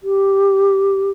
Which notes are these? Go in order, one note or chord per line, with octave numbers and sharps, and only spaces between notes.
G4